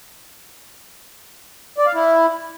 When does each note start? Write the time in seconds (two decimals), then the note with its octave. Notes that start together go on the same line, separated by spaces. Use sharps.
1.78 D5
1.86 F5
1.94 E4